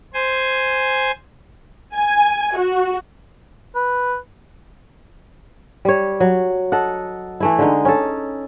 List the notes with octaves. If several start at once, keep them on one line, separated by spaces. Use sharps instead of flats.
C5 G#5
G#5
F#4
B4
G3 C#5
F#3
A4 D#5 F#5
E3 A3 E4
D3 G#3 D#4
C#4 A4